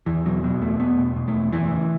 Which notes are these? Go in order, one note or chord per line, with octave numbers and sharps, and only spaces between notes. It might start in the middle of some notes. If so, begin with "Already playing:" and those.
E2 E3
B2 F#3
B2 F#3
E2 A3
E2 B3
B2
B2
A3
E2
F#2 E3
C#3